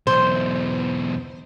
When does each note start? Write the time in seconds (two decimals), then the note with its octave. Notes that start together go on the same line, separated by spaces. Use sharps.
0.07 B1 E2 C5